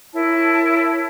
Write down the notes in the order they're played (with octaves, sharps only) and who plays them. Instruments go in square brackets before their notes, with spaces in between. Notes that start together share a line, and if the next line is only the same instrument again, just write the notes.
[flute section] E4 A#4 C#5 A5